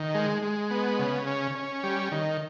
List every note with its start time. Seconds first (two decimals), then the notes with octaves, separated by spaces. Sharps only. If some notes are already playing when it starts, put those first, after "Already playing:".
Already playing: D#3
0.14 G#3
0.43 G#3
0.71 B3
0.99 C#3
1.27 C#4
1.55 C#4
1.83 G3
2.12 D#3